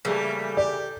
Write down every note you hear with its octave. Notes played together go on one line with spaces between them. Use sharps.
C#3 E3 G3 A3 A#3
G4 D5